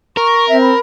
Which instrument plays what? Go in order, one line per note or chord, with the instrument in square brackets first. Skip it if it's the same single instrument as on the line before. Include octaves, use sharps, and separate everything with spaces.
[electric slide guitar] A#4 [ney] C#6
[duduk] C4 [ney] E5
[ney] B5